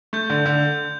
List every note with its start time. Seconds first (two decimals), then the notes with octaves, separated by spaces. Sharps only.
0.13 A3 G6
0.30 D3
0.46 D3